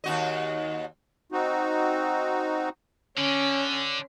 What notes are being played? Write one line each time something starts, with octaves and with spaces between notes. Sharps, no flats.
D#2 F#4 D#5
C4 D#4 F#4
D3 C#4